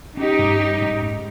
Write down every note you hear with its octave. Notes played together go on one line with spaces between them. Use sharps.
C#4 D#4 G4
G2
C#4
G#2
G#2